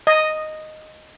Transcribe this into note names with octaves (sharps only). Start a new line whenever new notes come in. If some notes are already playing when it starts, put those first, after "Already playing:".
D#5